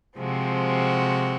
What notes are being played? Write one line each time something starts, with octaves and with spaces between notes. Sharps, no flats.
C3 F3 G#3 C4 F#4